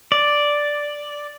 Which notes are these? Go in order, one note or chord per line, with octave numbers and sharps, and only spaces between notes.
D5